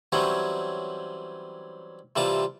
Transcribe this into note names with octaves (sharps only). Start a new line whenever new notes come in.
E3 F#3 G3 C4 C#4
C3 E3 G3 F4 A5